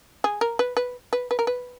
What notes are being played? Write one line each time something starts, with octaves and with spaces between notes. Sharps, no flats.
G#4
A#4
B4
B4
B4
B4
A#4
B4